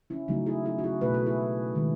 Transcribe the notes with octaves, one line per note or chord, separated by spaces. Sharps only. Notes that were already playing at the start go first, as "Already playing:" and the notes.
C#4 E4
C#3 F#3 A3 D#4 F#4
E4 G#4
E4 G#4
F#4
E4 G#4
B2 A3 G#4 B4
F#4 A4
E4 G#4
D#3 G#3